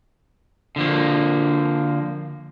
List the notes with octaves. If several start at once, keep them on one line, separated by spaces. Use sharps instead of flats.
D3 F3 A#3